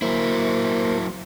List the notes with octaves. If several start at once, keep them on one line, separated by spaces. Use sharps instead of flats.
F#3 A#3 E4 C5